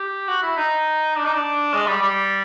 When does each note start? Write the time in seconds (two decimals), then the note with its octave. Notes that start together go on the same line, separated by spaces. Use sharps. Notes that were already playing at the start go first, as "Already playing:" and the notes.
Already playing: G4
0.28 F#4
0.43 E4
0.57 D#4
1.16 D4
1.25 D#4
1.34 D4
1.74 G#3
1.87 G3
2.02 G3